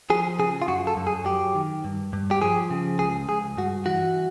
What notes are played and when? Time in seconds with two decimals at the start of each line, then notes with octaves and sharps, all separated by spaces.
0.10 F3 G#4
0.39 C#3 G#4
0.62 F4
0.68 F#2 F#4
0.87 A4
0.97 F#2
1.07 G#4
1.26 F#3 G4
1.55 D#3
1.84 G2
2.13 G2
2.31 G4
2.42 F3 G#4
2.71 C#3
2.99 C#2 G#4
3.28 C#2 G#4
3.57 G2 F#4
3.86 E3 F#4